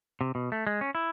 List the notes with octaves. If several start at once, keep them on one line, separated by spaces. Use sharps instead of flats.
C3
B2
A3
G#3
C#4
E4